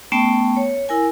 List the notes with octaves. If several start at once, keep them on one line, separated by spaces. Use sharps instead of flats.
A3 B3 C#4 G5 A5
C#5
E4 A#4 G#5